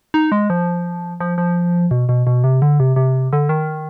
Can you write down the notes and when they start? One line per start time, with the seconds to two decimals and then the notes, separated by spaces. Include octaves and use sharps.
0.14 D#4
0.32 G#3
0.50 F3
1.20 F3
1.38 F3
1.91 B2
2.09 B2
2.27 B2
2.44 C3
2.62 D3
2.80 C3
2.96 C3
3.33 D3
3.49 D#3